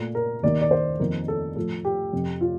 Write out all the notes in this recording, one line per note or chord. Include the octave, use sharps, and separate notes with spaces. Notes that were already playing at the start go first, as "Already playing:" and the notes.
Already playing: A#2 A3
A#4
D#2 D#3 A#3 D5
D5
C5
F2 D#3 A#3 A#4
A4
A2 F3 A3 A4
G4
F2 C3 F3
F4